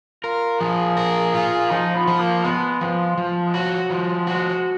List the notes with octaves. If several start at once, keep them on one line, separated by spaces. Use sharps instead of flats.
F4 A#4
F3 G#4
A#4
F4
F3 D#4
B3
F3
A#3
G#3 B3
F3 G#3
F3
G#3
F#3 F#4
F3 G#3
G#3 F#4